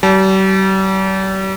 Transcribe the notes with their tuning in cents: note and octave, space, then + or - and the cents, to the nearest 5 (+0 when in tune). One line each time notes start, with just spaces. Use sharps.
G3 -40 A5 -30